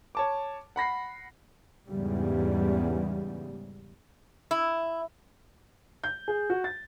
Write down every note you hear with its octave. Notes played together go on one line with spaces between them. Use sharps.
C#5 A5 D6
F#5 B5 A#6 C7
E2 G#2 C#3 G3
E4
G6
G#4
F#4
A6